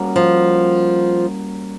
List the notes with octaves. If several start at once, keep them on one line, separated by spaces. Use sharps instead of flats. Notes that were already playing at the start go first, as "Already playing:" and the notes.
Already playing: G3 A#3 C#4 F#4 A#4
F3